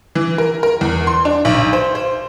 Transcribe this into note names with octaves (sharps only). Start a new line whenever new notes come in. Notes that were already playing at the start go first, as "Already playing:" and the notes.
E3
A#4
A#4
E2
C6
D4
B1
C5
C5